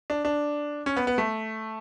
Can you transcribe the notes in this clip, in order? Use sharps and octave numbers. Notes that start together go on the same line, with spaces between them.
D4
D4
C#4
B3
B3
A3